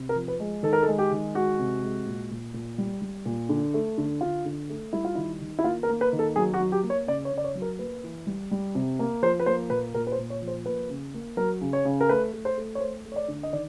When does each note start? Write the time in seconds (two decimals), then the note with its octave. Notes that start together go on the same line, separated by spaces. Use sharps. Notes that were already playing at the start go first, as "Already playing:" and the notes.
Already playing: C3
0.09 A#4
0.16 F3
0.28 B4
0.40 G#3
0.63 D#3 A4
0.73 A#4
0.83 A4
0.88 G#3
0.98 G4
1.11 D#3
1.35 G#3 F#4
1.59 C3
1.83 G#3
2.06 A#2
2.31 A#2
2.54 A#2
2.78 G3
3.02 G3
3.25 A#2
3.49 D3
3.74 A3
3.98 D3
4.21 D3 F4
4.45 D3
4.69 A3
4.93 G3 E4
5.05 F4
5.15 D#3 E4
5.41 D#3
5.59 E4
5.64 A#3 F4
5.83 A#4
5.89 A#3
6.01 B4
6.13 D#3
6.19 A4
6.36 F#3 G#4
6.54 F#4
6.60 F#3
6.72 G4
6.83 A#3
6.90 C#5
7.07 C#3 D5
7.25 C#5
7.32 C#3
7.38 D5
7.44 C#5
7.55 F#3
7.62 A#4
7.79 A#3 B4
8.04 E3
8.27 G3
8.51 G3
8.75 C3
8.99 A#3
9.23 F3 C5
9.40 B4
9.46 A#3 C5
9.70 A#2 B4
9.94 A#2 A#4
10.07 B4
10.12 C5
10.18 A#2
10.30 C#5
10.42 F3
10.47 C5
10.66 A#3 B4
10.90 C#3
11.14 A#3
11.37 F#3 A#4
11.61 C#3
11.73 C#5
11.85 C#3
12.01 A#4
12.09 A3 B4
12.33 A3
12.45 C5
12.57 A3
12.75 C#5
12.80 A3 C5
13.05 A3
13.12 C#5
13.16 D5
13.28 D3
13.43 D#5
13.53 D#3 D5